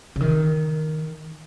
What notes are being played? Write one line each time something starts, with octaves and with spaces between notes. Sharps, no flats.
C#3
D#3